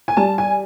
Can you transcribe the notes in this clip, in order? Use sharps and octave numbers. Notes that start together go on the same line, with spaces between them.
G#5
G3 A5
G#5